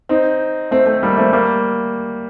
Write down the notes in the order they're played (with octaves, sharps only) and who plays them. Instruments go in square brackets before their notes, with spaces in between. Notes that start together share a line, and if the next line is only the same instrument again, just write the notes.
[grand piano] C4 D#4
A3 C4
A3 C4
G3 A#3
A3 C4
G3 A#3